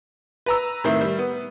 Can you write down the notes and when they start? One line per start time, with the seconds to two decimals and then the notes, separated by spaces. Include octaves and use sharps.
0.46 B4 A#5 E6
0.84 A2 D#3 C4 E4
1.01 G3
1.19 B3